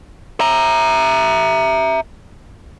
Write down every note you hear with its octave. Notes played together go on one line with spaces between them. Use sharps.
E5 A#5